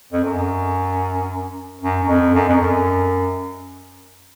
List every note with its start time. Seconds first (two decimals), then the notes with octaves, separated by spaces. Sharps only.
0.13 F2
0.24 F#2
1.82 F#2
2.04 F#2
2.07 F2
2.34 F#2
2.48 F2
2.61 F#2